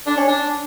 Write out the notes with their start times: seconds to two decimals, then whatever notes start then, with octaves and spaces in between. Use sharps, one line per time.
0.07 D4
0.17 C#4
0.28 D4